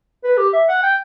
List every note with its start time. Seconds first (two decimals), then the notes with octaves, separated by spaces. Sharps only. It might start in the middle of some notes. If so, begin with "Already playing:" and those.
0.24 B4
0.38 G4
0.53 E5
0.69 F#5
0.83 G5